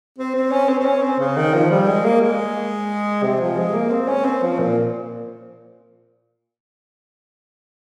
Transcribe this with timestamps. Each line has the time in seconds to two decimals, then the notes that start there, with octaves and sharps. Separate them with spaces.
0.19 C4
0.35 C4
0.52 C#4
0.69 C4
0.79 C4
0.86 C#4
1.02 C4
1.19 C#3
1.37 D#3
1.54 F3
1.71 G3
1.87 G#3
2.05 A#3
2.21 G#3
3.23 C3
3.40 F3
3.57 G#3
3.74 A#3
3.91 C4
4.08 C#4
4.25 C4
4.43 F3
4.59 A#2